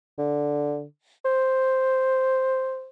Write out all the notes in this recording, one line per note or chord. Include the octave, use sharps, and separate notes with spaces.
D3
C5